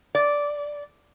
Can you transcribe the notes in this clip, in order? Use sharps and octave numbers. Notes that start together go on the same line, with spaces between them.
D5